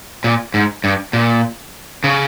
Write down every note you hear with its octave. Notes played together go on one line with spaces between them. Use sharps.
A#2
G#2
G2
A#2
C#3